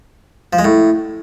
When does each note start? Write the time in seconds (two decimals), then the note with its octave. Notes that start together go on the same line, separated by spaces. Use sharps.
0.53 F3
0.59 G#3
0.64 A2